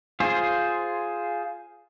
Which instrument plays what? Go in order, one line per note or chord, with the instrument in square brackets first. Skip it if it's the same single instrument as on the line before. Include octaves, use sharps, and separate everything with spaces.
[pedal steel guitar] F4 G#4 C5